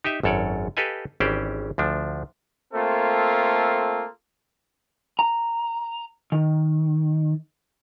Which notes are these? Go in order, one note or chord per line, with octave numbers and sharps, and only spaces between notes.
D#4 G4 D#5 E5
G#1 F#2 A4 C#5 D5
G4 A4 B4 D#5 F5 G#5
G#1 E3 C#4 G4 C5 D5
D2 F3 D4
A3 A#3 C4 F4 A4
A#5
D#3